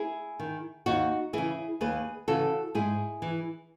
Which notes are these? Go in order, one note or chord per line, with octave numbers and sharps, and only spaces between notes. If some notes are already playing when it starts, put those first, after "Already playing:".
Already playing: E4 G#4
D#3
D#2 D#4 F#4
C#3 E3 E4 G#4
D#2 G#4 B4
C#3 E3 F#4 A4
G#2 E4 G#4
E3